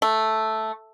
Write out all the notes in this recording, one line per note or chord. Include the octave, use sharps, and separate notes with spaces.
A3